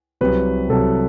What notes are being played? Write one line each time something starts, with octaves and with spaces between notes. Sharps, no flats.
C2 C3 F#3 B4
C2 C3 F#3 A4